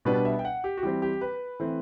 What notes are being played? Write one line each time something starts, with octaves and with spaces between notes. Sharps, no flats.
B2 G3 B3 D4 B4
E5
G5
F#5
G4
F#4
E3 G3 C4 G4
G4
B4
E3 A3 C4